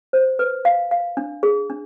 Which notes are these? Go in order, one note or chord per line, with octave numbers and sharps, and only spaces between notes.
C5
B4
F5
F5
D4
G#4
D4